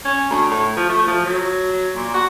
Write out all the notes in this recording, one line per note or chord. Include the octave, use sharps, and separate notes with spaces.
C#4
D2
A2
F3
A3
F3
F#3
A#2
F#4